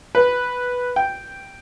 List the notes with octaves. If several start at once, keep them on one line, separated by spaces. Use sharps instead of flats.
B4
G5